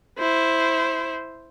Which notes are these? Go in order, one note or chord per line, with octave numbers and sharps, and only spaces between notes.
E4 C5